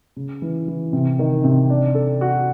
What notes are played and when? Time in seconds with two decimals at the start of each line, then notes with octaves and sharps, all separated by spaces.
0.17 C#3
0.42 E3
0.68 E3
0.93 C3
1.19 D#3
1.44 C3
1.70 D4
1.95 A4
2.21 F#4